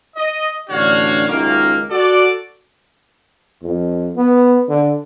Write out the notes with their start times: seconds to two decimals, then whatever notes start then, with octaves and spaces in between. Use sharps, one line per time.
0.17 D#5
0.69 A1 D3 D4 F#4 C#5 F5
1.28 C#2 F#2 D#3 A#3
1.90 F#4 A4 D5
3.63 F2
4.16 B3
4.69 D3